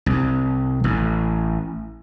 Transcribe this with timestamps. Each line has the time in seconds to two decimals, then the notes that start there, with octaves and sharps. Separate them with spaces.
0.06 C2
0.84 A1